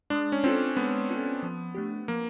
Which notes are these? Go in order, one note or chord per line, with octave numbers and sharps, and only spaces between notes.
G#3 D4
C#4
C4 C#4 F4 A4
G#3 B3
C#4 F4 A4
F3
A3 D4 G4
F3 A#3